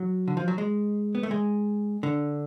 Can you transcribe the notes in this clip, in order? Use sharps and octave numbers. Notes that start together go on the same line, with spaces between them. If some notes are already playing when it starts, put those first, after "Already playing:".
Already playing: F#3
D3
F3
F#3
G#3
B3
A3
G#3
D3